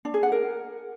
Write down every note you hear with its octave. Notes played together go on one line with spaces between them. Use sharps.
D4
G#4
F#5
A#4